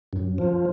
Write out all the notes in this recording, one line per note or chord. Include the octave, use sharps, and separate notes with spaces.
F#2
F3